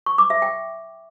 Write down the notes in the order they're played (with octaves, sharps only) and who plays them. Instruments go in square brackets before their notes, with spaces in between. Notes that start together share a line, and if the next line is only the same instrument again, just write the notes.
[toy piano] C#6
D6
E5
G5